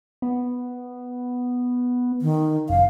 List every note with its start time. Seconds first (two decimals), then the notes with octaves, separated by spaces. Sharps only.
0.22 B3
2.22 D#3
2.69 F#1 F5